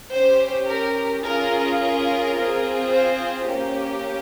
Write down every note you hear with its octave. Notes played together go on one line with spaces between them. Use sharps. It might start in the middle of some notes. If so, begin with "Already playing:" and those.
C#4 G4 C5
A#4
C#4 F4 G#4 A#4
A#4
C4 F4 G#4
C5
A#3 C#4 G4